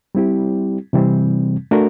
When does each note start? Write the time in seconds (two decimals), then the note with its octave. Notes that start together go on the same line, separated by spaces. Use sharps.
0.15 G3 C4 E4 G4
0.93 C3 E3 G3 C4
1.71 A3 D4 F#4 A#4